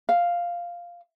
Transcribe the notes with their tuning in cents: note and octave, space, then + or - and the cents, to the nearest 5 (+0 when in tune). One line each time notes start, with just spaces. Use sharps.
F5 +0